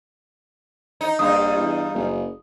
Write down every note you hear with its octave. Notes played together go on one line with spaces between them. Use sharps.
D#4
A#1 G2 D#4 D#6
E2
F#1